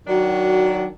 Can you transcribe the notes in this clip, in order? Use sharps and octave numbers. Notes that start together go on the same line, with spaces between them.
D#3 F#3 D4 F#4